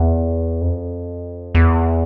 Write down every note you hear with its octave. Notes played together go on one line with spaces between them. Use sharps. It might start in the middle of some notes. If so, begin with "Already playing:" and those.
Already playing: E2
F2
E2